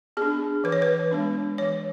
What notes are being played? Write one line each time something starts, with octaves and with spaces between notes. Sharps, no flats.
B3 D4 G#4
E3 B4
C#5
B4
G#3 B3 D4
E3 C#5